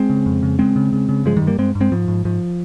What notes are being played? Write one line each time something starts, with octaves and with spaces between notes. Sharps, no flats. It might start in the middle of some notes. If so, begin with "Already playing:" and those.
Already playing: G#3 C4
C#3
F2
C#3
C#3 G#3 C4
C#3
C#3
C#3
G2 F3 G#3
D#3 G3
G2
G3 A#3
G2 G#3 C4
G2
G#3 C4
G#2 F3
G#2
G#2 F3